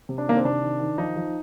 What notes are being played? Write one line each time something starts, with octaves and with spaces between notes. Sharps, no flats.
C3
D4
D#3 A#3
C4
C3 D4
D#3
D#3
F3 D#4
F3